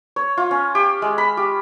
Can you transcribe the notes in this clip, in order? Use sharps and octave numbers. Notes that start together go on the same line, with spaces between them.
C#5
F4
C#4
G4
G#3
B5
G4